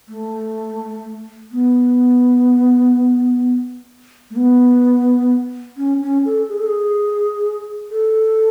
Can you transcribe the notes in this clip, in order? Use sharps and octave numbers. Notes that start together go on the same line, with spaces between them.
A3
B3
A3
B3
C#4
C#4
A4
G#4
A4
G#4
A4